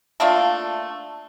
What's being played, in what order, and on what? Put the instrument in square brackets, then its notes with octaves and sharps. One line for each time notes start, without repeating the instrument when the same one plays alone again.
[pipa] A3 A#3 D4 F4